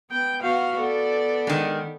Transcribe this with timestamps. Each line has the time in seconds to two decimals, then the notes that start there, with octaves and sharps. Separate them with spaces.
0.10 B3 G5
0.42 B3 F#4 F5
0.78 B3 A4 D5
1.47 D#3 G#3